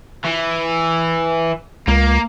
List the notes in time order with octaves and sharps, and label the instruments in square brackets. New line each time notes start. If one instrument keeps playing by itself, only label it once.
[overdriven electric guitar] E3
[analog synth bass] C#2 [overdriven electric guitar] A#3